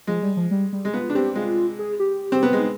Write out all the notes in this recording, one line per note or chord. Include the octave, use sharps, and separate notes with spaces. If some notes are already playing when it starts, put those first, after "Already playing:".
F3 G#3
G3
F3
G3
G3
G#3
B3 F4
D4
C4 G4
G#3 F4
G#4
G4
C4
B3
G#3
D#4